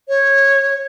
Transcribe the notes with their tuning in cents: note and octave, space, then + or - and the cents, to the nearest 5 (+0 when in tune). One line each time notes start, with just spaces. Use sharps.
C#5 -15